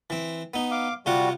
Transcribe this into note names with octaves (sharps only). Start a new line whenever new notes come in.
E3 C4
B3 D#4
F5 D6
C3 G3 F4 F#4 F#5